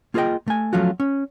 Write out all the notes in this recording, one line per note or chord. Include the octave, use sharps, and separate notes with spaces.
A#3 F4 G#4 B4 D#5 G5
A3 G#5
F3 F#3 A3 C#4 F4 F#4
C#4